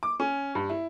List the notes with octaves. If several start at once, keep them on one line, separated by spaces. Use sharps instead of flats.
D6
C#4
G2
E4